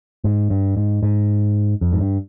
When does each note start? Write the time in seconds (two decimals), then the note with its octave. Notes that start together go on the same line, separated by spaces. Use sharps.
0.24 G#2
0.50 G2
0.77 G#2
1.03 G#2
1.81 F2
1.92 G#2
2.01 G2